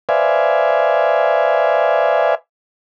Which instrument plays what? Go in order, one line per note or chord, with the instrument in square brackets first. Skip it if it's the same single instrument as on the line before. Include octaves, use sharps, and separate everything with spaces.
[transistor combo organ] B4 C5 D5 E5 F5 G#5